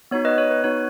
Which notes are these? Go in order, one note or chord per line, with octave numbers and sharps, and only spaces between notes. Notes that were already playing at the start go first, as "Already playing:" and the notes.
B3 D#4 F#4 C#5
B4 D#5
C#5
B4
B3 D#4 F#4 C#5